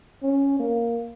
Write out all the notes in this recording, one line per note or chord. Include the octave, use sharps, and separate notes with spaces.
C#4
A#3